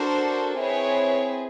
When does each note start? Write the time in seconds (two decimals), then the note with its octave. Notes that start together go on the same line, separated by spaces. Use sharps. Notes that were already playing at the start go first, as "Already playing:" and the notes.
Already playing: D4 F#4 A4 A#4 C5
0.59 C4 E4 G#4 B4 C#5